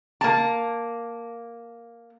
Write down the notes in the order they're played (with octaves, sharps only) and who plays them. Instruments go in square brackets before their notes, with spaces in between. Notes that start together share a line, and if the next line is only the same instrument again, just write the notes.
[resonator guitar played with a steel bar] A#3 A5